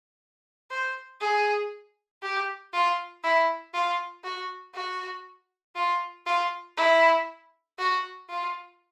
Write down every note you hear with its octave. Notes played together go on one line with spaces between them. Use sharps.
C5
G#4
G4
F4
E4
F4
F#4
F#4
F4
F4
E4
F#4
F4